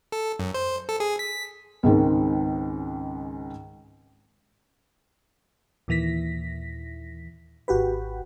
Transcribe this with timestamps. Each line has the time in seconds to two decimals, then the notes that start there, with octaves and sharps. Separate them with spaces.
0.12 A4
0.39 F#2
0.54 C5
0.89 A4
1.00 G#4
1.19 B6
1.83 C#2 G#2 D#3 C4
5.88 D#2 A#2 E3 A#6 B6
7.68 G#1 F#4 G4 B4